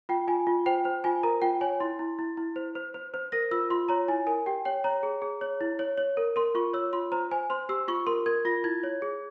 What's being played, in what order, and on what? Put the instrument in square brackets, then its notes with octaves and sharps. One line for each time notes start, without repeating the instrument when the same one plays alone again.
[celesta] F4 G5
F4 G#5
F4
C5 G5
C5
F4 G#5
A#4 A#5
F4 G5
C#5 G#5
E4 C6
E4
E4
E4
C5
C5
C5
C5
A#4 A#6
F4 E6
F4 C6
C#5 A#5
E4 G#5
A#4 G#5
G4 G5
C#5 G5
C#5 A#5
G#4
G#4
C#5
E4
C#5
C#5
A#4
A#4 C6
F4 C#6
C#5 E6
F4 C6
C5 A#5
C5 G#5
C5 C6
G4 E6
F4 C#6
A#4 C6
A#4 G#6
F4 A#6
E4 G#6
C#5
G#4